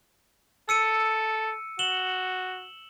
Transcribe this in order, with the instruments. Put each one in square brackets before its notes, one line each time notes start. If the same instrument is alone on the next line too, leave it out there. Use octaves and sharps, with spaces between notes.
[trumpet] A4 [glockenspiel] E6 C#7 D#7
[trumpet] F#4 [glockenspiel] E7 F#7 G7